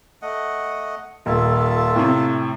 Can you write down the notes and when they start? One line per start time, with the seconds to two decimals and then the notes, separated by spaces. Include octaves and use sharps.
0.22 A3 D#5 F#5
1.26 D#1 F4 A4 E5
1.96 A2 C3